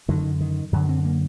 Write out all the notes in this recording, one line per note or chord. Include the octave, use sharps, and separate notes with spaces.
F#2 D3 D#3
D#3
F#2 D3 F#3
C4
A#3